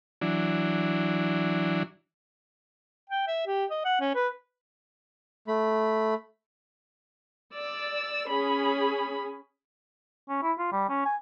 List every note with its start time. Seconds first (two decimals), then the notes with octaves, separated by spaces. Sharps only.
0.21 E3 F#3 D4
3.10 G5
3.27 E5
3.47 G4
3.70 D#5
3.85 F#5
4.00 C#4
4.15 B4
5.48 A3 B5
7.55 D5 E6
8.29 C#4 G#4 B5
10.29 C#4
10.43 E4
10.58 F4
10.72 G3
10.89 C#4
11.05 G#5